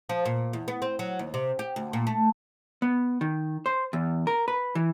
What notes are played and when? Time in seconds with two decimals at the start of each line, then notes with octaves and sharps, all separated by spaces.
0.09 F3
0.25 A#2
0.53 E2
0.68 B3
0.82 C4
0.99 F#3
1.19 D#2
1.34 C3
1.59 G4
1.76 D2
1.93 A#2
2.07 A3
2.82 B3
3.21 D#3
3.66 C5
3.93 E2
4.27 A#4
4.48 B4
4.75 E3